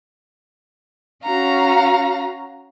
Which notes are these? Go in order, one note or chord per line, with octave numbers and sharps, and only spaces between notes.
C#4 F#4 F5 A#5